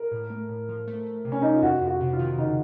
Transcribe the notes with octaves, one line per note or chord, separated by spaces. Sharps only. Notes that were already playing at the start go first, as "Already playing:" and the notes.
Already playing: A#4
A2
A3
A2
F3
A3
A3
C3
C#4
C3 D#4
F4
F2 F#4
F2
F#4
C3
F4
D#3
C#3 D#4